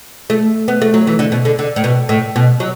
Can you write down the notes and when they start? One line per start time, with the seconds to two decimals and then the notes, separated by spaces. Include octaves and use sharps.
0.30 A3
0.68 B3
0.82 A3
0.94 F#3
1.07 E3
1.19 D3
1.32 B2
1.45 D3
1.59 D3
1.76 A2
1.84 B2
2.09 A2
2.36 B2
2.60 F#3